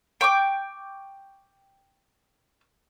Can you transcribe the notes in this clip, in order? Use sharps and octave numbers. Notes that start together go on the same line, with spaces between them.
G5 C#6 D6